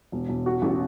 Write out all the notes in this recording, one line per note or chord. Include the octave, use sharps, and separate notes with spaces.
E1
E1
F#4
A1